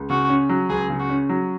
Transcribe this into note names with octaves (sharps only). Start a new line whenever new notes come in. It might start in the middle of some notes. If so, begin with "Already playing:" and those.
Already playing: C#2
C#3 F#4
C#4
F#3
C#2 G#4
C#3
F#4
C#4
F#3